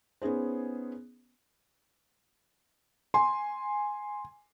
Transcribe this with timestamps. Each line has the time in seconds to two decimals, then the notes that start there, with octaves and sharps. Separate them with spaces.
0.22 B3 C#4 D#4 G#4 C5
3.14 G#5 C6